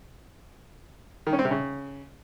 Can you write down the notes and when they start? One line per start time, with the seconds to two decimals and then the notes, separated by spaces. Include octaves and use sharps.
1.27 D#3
1.33 C#4
1.39 C4
1.45 C3
1.51 C#3